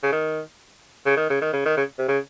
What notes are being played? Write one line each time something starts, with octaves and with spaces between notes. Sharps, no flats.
C#3
D#3
C#3
D#3
C#3
D#3
C#3
D#3
C#3
C3
C#3